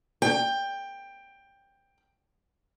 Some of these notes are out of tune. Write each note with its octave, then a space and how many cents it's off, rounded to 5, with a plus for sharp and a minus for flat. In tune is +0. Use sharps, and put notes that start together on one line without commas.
G5 +15